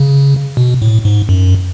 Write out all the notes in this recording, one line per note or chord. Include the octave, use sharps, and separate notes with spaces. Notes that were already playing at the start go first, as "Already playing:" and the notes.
Already playing: C#3
B2
A2
G#2
F#2